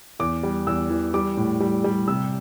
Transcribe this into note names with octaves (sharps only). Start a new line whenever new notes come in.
E2 D6
G3
E2 E6
E3
G3 D6
A2
G3
G3
C3 E6